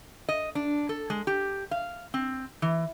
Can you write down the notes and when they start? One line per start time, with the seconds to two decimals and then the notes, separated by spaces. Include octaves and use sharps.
0.29 D#5
0.55 D4
0.89 A4
1.10 G#3
1.27 G4
1.71 F5
2.14 C4
2.62 E3